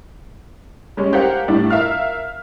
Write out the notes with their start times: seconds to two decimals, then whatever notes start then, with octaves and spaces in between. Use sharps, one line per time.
0.97 G3 G#3 C#4
1.13 G4 A#4 C5 F5 F#5
1.48 A2 G3 D4 E4
1.70 A#4 E5 F5 F6